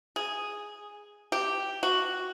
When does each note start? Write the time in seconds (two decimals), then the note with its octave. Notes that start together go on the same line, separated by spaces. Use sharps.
0.16 G#4
1.32 G4
1.83 F#4